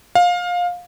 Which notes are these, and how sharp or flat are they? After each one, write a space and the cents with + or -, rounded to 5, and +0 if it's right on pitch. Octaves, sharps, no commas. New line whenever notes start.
F5 +20